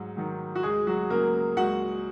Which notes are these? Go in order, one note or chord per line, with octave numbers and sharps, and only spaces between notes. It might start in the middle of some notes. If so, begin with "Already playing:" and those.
Already playing: G#2 F#3
D#3 F#3
F#4
C#2 G#3 G#4
F#3 F#4
C#3 F#3 A#3 A#4
C#2 F#4 F#5